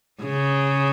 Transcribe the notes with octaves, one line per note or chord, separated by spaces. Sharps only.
C#3